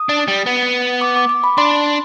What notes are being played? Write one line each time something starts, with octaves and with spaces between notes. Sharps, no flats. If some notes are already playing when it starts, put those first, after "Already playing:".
Already playing: D#6
D4
G3
B3
D6
D6
D6
B5
D4 C6
C6